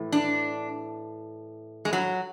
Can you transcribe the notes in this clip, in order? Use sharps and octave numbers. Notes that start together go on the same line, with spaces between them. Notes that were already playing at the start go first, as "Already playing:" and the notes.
Already playing: A2 E3
D4
G#3
F#3